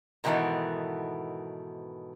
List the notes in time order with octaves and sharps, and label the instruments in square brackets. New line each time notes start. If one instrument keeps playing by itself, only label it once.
[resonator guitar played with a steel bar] G#2 B2 D#3 E3 A3 B3